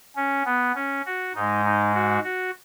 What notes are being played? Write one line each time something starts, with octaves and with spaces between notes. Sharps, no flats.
C#4
B3
C#4
F#4
G#2 G#3 D#4
D#4
F#4
F#4